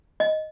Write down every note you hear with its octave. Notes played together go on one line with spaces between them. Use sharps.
D#5